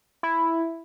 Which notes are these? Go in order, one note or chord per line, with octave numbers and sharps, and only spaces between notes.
E4